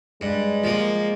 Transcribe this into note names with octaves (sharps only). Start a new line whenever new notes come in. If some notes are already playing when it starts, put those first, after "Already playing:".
G2 G#3
F3 A#3